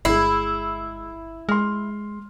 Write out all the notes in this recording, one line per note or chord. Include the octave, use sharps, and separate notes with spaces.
G1 G#3 E4 C7
G#3 C6 F6